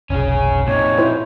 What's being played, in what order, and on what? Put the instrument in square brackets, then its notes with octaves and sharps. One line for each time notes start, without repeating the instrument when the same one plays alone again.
[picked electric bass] F1 B1 [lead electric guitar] C#4 G#4
[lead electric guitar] F2 D#4 [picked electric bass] A#2 [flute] C#5
[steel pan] E4 C5